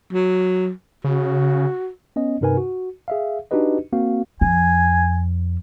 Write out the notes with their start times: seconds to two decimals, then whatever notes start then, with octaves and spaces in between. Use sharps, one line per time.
0.13 F#3
1.04 C#3 F#4
2.16 B3 C#4 D#5
2.41 G2 C3 D#4 A#4 B4 G#5
2.57 F#4
3.08 G#4 E5 F5
3.51 D4 D#4 F#4 G4 B4 D#5
3.93 A#3 C4 F#4 F5
4.41 F2 G#5